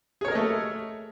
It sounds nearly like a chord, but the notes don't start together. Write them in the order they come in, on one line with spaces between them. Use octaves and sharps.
G#4 C#5 A#4 D#5 A3